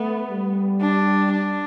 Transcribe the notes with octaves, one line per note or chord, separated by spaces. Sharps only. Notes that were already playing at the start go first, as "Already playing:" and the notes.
Already playing: A3 B3
G3
D4
D4